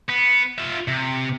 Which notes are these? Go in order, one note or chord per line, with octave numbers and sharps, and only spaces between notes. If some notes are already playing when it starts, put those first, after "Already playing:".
B3
F4 E5
C3